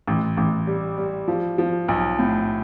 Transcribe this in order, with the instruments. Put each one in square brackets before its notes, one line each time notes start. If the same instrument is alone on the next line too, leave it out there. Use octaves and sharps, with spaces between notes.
[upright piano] A1
A1
G3
G3
F3
F3
B1
A2